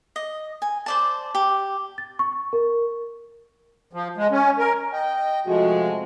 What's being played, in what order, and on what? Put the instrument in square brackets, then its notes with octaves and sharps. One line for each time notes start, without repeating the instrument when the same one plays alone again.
[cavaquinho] D#5
G#5
C5 D5 A5
G4
[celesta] A6
C#6
A#4
[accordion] F3
G#3
C#4
A#4
[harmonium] D#5 G5
[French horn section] C3 G#3 [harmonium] F3 A3 F#4